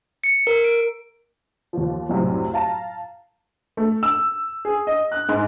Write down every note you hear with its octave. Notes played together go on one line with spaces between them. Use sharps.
C#7
A#4
D7
D#2 F3
C2 F#2 A2 C3
F5 A5 A#5
A3
E6
G#4
D#5
F#6
G#2